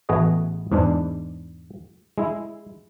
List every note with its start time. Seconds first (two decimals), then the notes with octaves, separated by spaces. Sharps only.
0.09 A1 A3 B3 F#4 G#4 D#5
0.72 E2 G#2 G#3 D4
2.18 G#3 E4